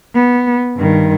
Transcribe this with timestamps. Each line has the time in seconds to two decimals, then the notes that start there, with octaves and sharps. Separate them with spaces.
0.15 B3
0.76 G2 D#3